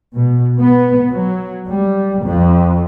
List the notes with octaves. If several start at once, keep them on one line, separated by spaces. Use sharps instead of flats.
B2
B3
F#3
G3
F2